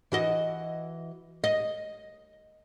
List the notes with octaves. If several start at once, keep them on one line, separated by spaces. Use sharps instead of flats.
E3 F#4 D#5
D#5